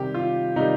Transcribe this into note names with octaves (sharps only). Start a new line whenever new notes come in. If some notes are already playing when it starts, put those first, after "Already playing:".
Already playing: C3 D#3 G3 G4
F4
C3 D#3 G3 D#4